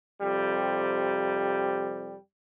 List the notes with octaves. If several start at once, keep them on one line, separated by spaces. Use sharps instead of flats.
F2 C3 G3